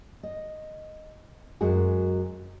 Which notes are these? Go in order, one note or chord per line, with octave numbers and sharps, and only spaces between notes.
D#5
F#2 F#3 G#3 F#4 G#4